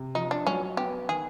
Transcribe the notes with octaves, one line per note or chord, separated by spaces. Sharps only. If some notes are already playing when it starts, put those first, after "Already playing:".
Already playing: C3
F3 D#4
D4
F#3 C#4
B3 G4
D#3 G#4